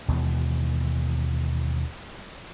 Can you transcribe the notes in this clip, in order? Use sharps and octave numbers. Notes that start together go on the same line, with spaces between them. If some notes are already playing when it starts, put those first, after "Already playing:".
D#2 B2 E3 G#3